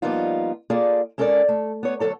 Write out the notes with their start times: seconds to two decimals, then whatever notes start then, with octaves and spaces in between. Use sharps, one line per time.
0.02 F3 G3 A#3 B3 D#4 F4
0.70 A#3 F4 G#4 A4 D5
1.18 G#3 C#4 A4 A#4 C#5 D5
1.48 A3
1.83 B3 C#5
2.00 D2 A#2 F#3 A4 C#5